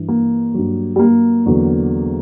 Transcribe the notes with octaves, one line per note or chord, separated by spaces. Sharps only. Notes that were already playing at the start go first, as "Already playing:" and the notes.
Already playing: G2 E3
A#3
G2 F#3
G3
A#3
E2 D3 F#3